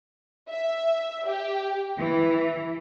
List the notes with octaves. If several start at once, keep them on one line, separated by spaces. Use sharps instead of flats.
E5
G4
E3